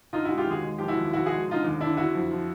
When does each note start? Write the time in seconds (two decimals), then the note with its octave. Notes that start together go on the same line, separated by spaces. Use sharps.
0.13 D3 D#4 F4
0.25 G#3 E4 F#4
0.38 F4 G4
0.47 D#2 F#4 G#4
0.63 G#3
0.78 F3 G4
0.88 E4 F#4
0.97 D#2
1.13 F3 E4 F#4
1.26 G#3 F#4 G#4
1.48 D3 D#4 F4
1.64 D#2
1.81 D3 D4 E4
1.97 D3 E4 F#4
2.15 F2
2.31 F3